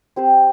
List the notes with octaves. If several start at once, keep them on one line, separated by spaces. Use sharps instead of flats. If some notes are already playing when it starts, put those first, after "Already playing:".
C4 G4 C5